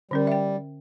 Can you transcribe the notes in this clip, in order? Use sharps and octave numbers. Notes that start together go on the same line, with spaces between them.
D3 G3 C#4 A#4
E5 G5